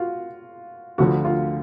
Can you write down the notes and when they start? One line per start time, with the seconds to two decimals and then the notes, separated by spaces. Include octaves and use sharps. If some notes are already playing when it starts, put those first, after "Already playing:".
Already playing: F4 F#4
0.98 D2 D3 F3 F#4
1.25 F4